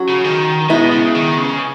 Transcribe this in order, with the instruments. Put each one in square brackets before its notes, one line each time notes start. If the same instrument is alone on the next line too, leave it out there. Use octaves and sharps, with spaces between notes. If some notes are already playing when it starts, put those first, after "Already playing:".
Already playing: [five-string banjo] F#3 C#4 F#4
[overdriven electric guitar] C#3
D#3
[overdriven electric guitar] B2 [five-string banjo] G#3 B3 E4
[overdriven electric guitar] C#3
D#3
C#3